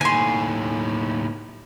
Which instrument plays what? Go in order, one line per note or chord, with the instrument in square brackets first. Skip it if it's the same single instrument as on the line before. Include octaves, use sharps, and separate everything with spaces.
[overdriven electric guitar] D#2 A2 [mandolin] G#5 C6